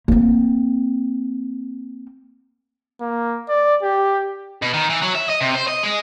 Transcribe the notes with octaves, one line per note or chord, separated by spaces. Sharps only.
A#3 C4
A#3
D5
G4
B2
D#3
E3
F#3
E5
D#5
C3
C5
D#5
G#3